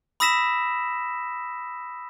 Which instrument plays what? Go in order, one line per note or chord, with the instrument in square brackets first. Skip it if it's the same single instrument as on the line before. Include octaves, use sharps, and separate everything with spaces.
[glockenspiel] B5 D#6 E6 A#6 B6 E7